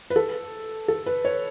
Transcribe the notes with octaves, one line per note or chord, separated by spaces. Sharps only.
B4
A4
A4
B4
C#5